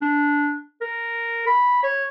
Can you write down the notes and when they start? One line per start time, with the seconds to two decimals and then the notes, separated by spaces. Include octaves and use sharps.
0.02 D4
0.81 A#4
1.47 B5
1.83 C#5